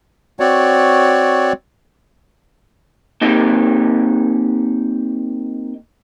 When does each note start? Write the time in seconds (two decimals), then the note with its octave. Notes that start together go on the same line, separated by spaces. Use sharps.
0.40 C4 F#4 C#5 D5
3.21 A#3 C4 D#4 G4